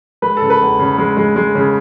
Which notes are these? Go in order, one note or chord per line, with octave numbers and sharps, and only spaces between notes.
G#3 B4
A4
C#3
B4
E2
C#3
G#3
G#3
G#3
C#3